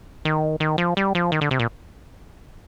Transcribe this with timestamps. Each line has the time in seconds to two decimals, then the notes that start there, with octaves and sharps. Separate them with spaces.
0.25 D#3
0.60 D#3
0.78 F3
0.97 G3
1.15 F3
1.32 D#3
1.41 D3
1.51 C3
1.59 A#2